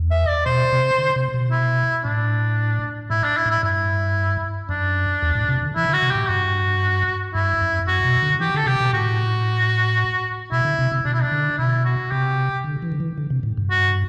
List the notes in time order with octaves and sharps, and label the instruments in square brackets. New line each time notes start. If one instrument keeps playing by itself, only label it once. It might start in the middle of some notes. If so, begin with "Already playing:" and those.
Already playing: [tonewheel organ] E2
[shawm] E5
D5
[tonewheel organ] B2 [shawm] C5
[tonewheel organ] C3
D3
C3
B2
[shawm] E4
[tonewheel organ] A2 [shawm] D4
[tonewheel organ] A2 [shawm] E4
[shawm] D4
E4
[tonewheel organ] A2
[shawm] E4
[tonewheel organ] G2 [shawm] E4
[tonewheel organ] F#2 [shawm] D4
[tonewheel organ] E2
A2
C3
D3
[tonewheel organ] E3 [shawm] E4
[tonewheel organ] D3
[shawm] F#4
[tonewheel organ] C3
[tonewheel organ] A2 [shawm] G4
[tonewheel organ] G2 [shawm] F#4
[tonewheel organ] G2 [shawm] E4
[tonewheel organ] F#2
[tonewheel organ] F#2 [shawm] F#4
[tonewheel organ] B2
D3
[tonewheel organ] E3 [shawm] G4
[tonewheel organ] D3 [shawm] A4
[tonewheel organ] C3 [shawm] G4
[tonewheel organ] B2
[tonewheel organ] A2 [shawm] F#4
[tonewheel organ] B2 [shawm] E4
[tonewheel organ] D3
C3
C3
[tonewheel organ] B2 [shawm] D4
[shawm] E4
D4
[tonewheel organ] D3
[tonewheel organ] B2 [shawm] E4
[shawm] F#4
[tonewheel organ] C3 [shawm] G4
[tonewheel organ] D3
E3
D3
E3
D3
C3
A2
G2
[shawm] F#4